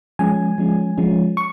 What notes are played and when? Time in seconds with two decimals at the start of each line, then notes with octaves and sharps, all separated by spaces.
0.19 F3 G#3 C#4 G#5
0.58 F3 G#3 C#4
0.98 F3 G#3 C#4
1.37 C#6